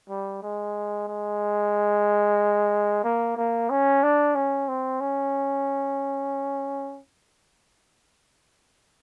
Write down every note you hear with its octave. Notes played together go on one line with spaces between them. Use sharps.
G3
G#3
G#3
A#3
A#3
C#4
D4
C#4
C4
C#4